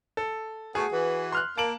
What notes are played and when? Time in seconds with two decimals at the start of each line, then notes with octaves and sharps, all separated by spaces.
0.17 A4
0.75 A3 B3 F#4 G#4
0.92 E3 F#4 B4
1.32 C6 F6 F#6
1.58 A#3 A5 D7 F#7